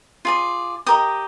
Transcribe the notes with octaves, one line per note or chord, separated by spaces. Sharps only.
F4 G#4 D5
G4 A#4 D#5 D#6